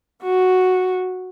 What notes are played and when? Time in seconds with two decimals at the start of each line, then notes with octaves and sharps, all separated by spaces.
0.23 F#4